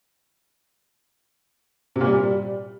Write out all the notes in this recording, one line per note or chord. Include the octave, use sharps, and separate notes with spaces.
C3
A#2
G3